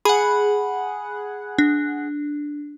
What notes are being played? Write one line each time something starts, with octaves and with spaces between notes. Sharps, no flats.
G#4 F#5 B5
D4